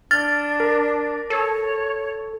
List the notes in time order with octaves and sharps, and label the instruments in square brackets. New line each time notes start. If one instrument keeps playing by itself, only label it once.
[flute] D4 [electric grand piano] F6 [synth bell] A6
[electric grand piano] A#4
[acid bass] A4 [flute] C#5